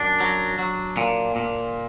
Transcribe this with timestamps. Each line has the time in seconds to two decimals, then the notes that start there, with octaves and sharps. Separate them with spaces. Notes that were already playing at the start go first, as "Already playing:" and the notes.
Already playing: F#2 D4
0.20 F#3
0.59 F#3
0.97 A#2
1.36 A#2